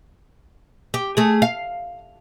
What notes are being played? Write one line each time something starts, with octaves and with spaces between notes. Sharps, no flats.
G4
A3 G#4
F5